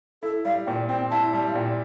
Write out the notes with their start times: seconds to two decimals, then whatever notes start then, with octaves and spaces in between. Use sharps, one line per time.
0.22 E4 A4
0.45 G3 F5
0.67 A#2 G5
0.89 C4 G5
1.11 E4 A5
1.33 G3 A5
1.49 F5
1.55 A#2 G5